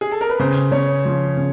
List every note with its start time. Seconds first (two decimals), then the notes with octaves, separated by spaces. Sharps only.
0.01 G#4
0.11 A4
0.21 A#4
0.29 B4
0.40 C#3 C5
0.72 C#3 C#5
1.05 F3
1.37 C#3